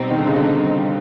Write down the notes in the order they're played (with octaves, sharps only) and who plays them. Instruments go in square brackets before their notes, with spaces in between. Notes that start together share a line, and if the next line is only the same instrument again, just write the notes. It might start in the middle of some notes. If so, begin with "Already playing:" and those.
Already playing: [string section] B2 G3 C4 D#4
[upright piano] D#3
D3
C#3
D3